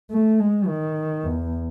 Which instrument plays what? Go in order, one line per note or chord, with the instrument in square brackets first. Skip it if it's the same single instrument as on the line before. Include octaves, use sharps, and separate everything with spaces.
[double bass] A3
G#3
D#3
E2